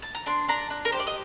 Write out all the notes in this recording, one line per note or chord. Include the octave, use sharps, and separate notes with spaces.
A5
A#5
D4 C6
D4 A#5
D4
A#4
G4 C5
D5
D#5